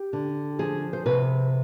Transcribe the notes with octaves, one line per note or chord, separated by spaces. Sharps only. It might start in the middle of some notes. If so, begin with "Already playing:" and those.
Already playing: G4
D3
F3 G#4
C5
C3 B4